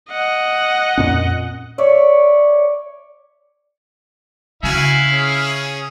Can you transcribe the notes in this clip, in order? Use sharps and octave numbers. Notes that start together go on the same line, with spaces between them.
D#5 F#5
F2 A#2 C#4
C#5 D5 E5
C#3 E4 F#4 F5 G#5
C#4 G#4